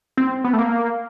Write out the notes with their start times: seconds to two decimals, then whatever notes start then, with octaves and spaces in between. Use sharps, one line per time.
0.17 C4
0.44 B3
0.53 A3
0.59 A#3